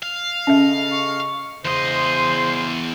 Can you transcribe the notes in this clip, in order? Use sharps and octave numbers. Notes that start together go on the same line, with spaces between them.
F5
C#3 C#4 A4 D#5 E5
C#6
E2 C#3 C5 D#5 C6